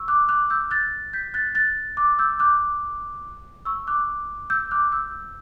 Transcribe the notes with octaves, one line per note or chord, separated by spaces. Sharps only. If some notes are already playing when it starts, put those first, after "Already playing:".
Already playing: C#6 E6
D6 F#6
D6 F#6
E6 G6
F#6 A6
G6 B6
F#6 A6
F#6 A6
D6 F#6
E6 G6
D6 F#6
C#6 E6
D6 F#6
E6 G6
D6 F#6
E6 G6